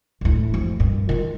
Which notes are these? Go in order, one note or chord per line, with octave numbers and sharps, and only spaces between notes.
D1 A2
F2
G2 A#2
D#3 F4